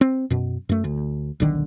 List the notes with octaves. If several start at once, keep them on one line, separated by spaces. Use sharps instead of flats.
C4
F#2 B2
F#2 A3
D2
D#1 B1 D3 D#3